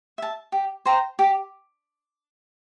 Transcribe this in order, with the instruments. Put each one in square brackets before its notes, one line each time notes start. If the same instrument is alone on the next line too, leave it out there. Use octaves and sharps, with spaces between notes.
[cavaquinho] E5 A5
G4
C5 G5 A#5
G4